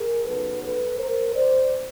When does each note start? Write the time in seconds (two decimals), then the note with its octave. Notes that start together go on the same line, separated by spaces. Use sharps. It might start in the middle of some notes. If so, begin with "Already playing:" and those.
Already playing: G#4 A#4
0.25 C#3 F#3 B3 D#4 A4 B4
0.63 A4 B4
0.99 A#4 C5
1.36 C5 D5